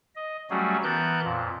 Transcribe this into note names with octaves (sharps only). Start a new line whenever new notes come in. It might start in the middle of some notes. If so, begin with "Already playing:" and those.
D#5
F#3 G3 A3 C#4 F#4 G#4
E3 B3 A#4 A5 F#6 G6
F2 A#2